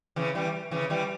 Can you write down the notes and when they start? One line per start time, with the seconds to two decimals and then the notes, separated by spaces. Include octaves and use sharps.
0.16 C#3 E3
0.35 E3 G3
0.71 C#3 E3
0.90 E3 G3